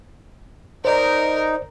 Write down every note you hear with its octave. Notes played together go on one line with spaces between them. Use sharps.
D#4 A#4 C5 D5